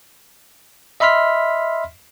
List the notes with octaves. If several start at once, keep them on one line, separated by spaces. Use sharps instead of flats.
D#5 E5 B5 C6 F6 B6